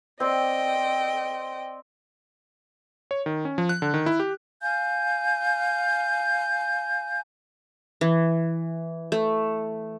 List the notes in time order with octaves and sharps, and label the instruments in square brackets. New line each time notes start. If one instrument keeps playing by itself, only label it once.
[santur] C4 D5 [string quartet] D#5 G5
[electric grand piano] C#5
D#3
C#4
F3
F#6
D3
D#3
E4
G4
[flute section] F5 G#5 G6
[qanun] E3
A3